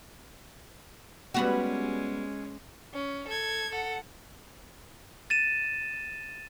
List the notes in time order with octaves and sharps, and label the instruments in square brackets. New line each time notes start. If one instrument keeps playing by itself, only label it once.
[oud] G3 B3 F#4 [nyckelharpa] G#3 C#4
[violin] C#4
A4 G#6
A4 F#5
[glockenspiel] A6 D#7 E7